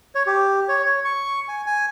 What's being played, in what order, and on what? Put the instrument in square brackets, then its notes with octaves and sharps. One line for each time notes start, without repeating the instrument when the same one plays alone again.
[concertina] C#5
G4
C#5
C#5
C#6
G#5
G#5